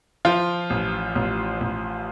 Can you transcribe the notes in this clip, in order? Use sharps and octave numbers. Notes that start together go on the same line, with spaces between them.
F3 F4
A1
A1
A1